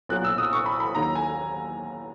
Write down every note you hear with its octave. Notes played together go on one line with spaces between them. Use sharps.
B1 A#2 F#3 F#6
E6
D#6
C#6
B5
B5
D#2 D#3 F#3 A#5
G#5